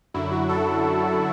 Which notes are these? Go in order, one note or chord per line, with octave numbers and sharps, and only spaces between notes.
F#2 D3 F#3 E4
F#4
A4